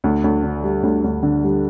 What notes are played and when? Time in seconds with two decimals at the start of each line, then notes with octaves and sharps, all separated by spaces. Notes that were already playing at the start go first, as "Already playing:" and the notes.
0.04 D2
0.24 D2
0.43 D3
0.64 G3
0.83 D2
1.04 D2
1.23 D3
1.44 G3